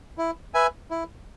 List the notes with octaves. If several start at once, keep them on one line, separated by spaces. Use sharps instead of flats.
E4
B4 E5 G#5
E4